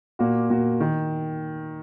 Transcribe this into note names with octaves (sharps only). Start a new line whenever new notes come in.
A#2 A#3 F#4
A#2 A#3 F#4
D#3